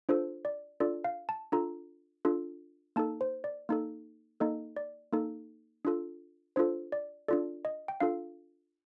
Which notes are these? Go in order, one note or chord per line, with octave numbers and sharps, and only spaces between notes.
D4 F4 A4 C5
D5
D4 F4 A4 D5
F5
A5
D4 F4 A4 A#5
D4 F4 A4
A#3 D#4 A4 A5
C5
D5
A#3 D#4 A4
A#3 D#4 A4 D#5
D5
A#3 D#4 A4
D4 F4 A4
D4 F4 A4 C5
D5
D4 F4 A4 D5
D#5
G5
D4 F4 A4 F5